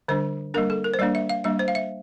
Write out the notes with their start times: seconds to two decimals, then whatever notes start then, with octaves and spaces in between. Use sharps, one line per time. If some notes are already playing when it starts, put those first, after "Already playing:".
0.08 D3 G3 D4 C5
0.54 G3 A#3 D4 A#4
0.70 A4
0.84 A#4
0.94 C5
0.99 G3 A#3 D4 D5
1.15 E5
1.29 F5
1.44 G3 A#3 D4 E5
1.59 C5
1.68 F5
1.75 E5